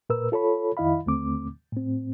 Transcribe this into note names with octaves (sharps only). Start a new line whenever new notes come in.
A#2 A#4 B4 E6
F4 A4 C#5 B5
F2 D#3 E4 D#5 F5 B5
D#2 D3 A3 C4 D6
A2 C4